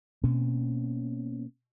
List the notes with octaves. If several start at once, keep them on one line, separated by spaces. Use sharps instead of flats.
B2 A#3 C4 C#4